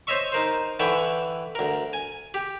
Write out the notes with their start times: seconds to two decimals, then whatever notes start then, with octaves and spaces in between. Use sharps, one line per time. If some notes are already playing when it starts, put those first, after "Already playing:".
0.07 C5 C#5 D#5 E5 C#6
0.32 D#4 A#4 C5
0.79 D3 E3 E4 G5 C#6
1.55 D2 A#4
1.93 G#5
2.34 G4